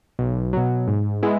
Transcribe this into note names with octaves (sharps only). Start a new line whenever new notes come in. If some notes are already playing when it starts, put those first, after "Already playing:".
B1
B2 F#3
G#2
G#3 B3 E4